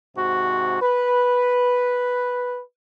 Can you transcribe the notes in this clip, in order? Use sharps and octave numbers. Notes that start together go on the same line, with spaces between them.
G#2 C3 F#4
B4